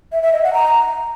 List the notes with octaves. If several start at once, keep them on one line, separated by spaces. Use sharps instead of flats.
E5
E5
D#5
F#5
A#5